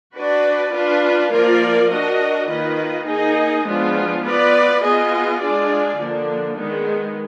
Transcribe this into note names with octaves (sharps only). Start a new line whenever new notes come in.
D4 F#4 B4 D5
D4 F4 B4
F3 A#3 F4 A#4 D5
D4 F#4 A#4 D#5
D#3 A#3 F4 B4 D#5
A#3 D#4 G#4 D#5
F3 G#3 B3 D4 F4
B3 F4 B4 D5
B3 F4 G#4 D#5
G#3 D4 F4 G#4 D5
D3 F3 A#3 D4
D#3 G#3 B3